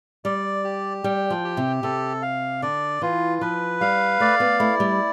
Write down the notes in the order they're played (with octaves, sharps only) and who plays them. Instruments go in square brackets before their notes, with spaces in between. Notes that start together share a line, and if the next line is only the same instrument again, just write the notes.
[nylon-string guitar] G3 [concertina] D5
[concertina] G4
[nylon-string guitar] G3 [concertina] G5
[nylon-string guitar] F3
[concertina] G4
[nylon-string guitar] C3
[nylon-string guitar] C3 [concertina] A4
[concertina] F5
[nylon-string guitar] D3 [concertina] D5
[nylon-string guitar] E3 [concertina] F4
[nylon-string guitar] F3 [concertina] B4
[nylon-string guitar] G3 [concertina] F5
[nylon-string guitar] A3 [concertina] D5
[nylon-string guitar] B3
[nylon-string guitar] A3 [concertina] E4
[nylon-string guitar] G3